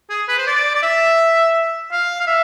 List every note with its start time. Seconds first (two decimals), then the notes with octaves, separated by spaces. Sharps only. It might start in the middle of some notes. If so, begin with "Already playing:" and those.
0.09 G#4
0.28 B4
0.38 C5
0.47 D5
0.75 D5
0.82 E5
1.92 F5
2.20 F5
2.27 E5